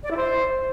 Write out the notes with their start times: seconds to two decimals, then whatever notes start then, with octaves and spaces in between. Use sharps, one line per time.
0.04 D5
0.10 E4
0.16 C5